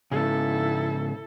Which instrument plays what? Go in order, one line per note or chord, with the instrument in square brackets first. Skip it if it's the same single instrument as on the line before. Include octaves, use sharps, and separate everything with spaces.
[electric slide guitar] G#2 C#3 [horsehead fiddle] E4 A4